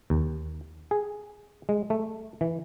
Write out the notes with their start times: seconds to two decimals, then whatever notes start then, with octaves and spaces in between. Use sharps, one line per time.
0.10 D#2
0.91 G#4
1.69 G#3
1.90 A3
2.41 E3